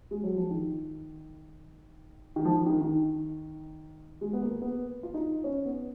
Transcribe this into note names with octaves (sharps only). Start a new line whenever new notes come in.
G#3
F#3
F3
D#3
D#3
F3
D#3
D#3
D#3
G#3
B3
A#3
B3
F4
D#4
C#4
B3